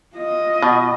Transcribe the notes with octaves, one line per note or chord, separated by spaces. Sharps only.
F4 D#5
B2